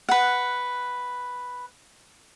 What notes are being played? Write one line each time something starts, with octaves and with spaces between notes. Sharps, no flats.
B4 F#5